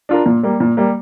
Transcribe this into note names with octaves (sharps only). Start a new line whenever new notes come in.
D4 F4 A#4
A#2
G3 A#3
A#2
G3 A#3